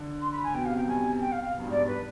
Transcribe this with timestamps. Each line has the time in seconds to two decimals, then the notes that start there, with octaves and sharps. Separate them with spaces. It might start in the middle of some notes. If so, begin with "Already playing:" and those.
Already playing: D3
0.21 C6
0.32 B5
0.44 G#5
0.54 B2 G5
0.66 C3 F5
0.76 C3 G5
0.87 G2 G#5
1.21 G5
1.32 F5
1.43 F5
1.54 B2
1.60 G2
1.65 G#2
1.71 D5
1.77 G2
1.87 B4